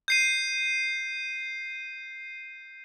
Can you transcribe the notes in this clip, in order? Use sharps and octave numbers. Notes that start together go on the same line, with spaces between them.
G6 C7 D#7